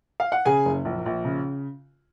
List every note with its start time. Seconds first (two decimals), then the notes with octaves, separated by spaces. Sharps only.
0.20 F5
0.32 F#5
0.45 C#3 G#4 G#5
0.65 F#1
0.85 A#1
1.06 A#1
1.25 C#3